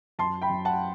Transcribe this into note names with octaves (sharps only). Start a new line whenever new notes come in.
F#2 A5 C6
G5 B5
F#2
F#5 A5